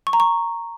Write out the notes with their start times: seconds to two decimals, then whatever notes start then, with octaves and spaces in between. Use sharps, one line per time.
0.07 C#6
0.13 A#5
0.20 C#6